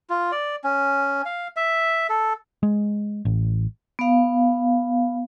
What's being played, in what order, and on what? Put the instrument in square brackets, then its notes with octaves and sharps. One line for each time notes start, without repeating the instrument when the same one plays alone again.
[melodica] F4
D5
C#4
F5
E5
A4
[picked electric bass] G#3
A1
[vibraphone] B3 F5